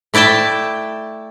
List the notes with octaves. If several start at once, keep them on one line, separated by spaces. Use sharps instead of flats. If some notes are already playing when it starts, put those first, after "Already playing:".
A3 E4 D5 G5 A5